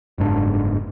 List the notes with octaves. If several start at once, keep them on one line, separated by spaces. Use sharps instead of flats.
F#1 G#2 D4